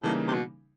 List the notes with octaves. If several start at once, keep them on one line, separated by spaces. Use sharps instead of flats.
A2 C#3 E3 G3 A#3 D#4
C3
B2